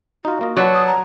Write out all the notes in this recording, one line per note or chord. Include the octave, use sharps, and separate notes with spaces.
D#4 F4 F#4
A#3 F4 D#5
F#3 B4 D5 F#5 A5
D#6
A#5